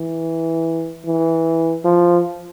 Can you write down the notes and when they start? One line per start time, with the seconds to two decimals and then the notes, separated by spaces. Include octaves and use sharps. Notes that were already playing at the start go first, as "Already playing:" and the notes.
Already playing: E3
1.06 E3
1.84 F3